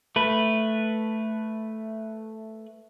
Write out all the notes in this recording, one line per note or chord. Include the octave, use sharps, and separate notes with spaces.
A3 B4